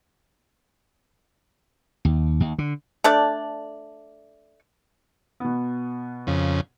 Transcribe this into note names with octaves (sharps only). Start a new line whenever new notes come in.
D#2
D#2
D3
A3 D4 A4 D5
B2 B3
F2 C#3